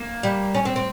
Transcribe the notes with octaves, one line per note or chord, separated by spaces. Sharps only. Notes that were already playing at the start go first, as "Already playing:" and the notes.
Already playing: A#3
G3
C#4
C4
C4